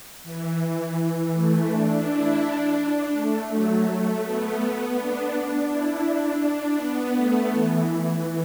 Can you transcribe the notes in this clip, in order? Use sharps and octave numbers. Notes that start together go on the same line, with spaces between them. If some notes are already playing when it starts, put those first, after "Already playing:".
E3
E3
E3
A3
D4
E4
D4
D4
A3
F#3
A3
B3
D4
D4
E4
D4
D4
B3
A3
E3